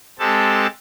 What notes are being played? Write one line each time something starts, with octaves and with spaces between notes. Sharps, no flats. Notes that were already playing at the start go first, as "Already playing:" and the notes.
G#3 C4 G4 A4 A5